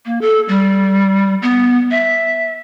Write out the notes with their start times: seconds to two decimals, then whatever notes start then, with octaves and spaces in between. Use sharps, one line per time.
0.06 A#3
0.21 A4
0.48 G3
1.42 B3
1.91 E5